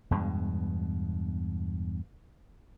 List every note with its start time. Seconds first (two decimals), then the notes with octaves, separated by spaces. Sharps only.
0.11 E2 G2 B2 G#3